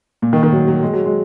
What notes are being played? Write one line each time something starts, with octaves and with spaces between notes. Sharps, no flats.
A#2
D#3
D#3
F#3
F#3
G#3
F#3
G#3